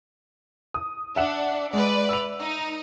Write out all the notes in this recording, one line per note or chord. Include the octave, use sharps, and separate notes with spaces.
D#6
D4 E5 F#5 E7
G#3 B4 D5
E6 F7
D#4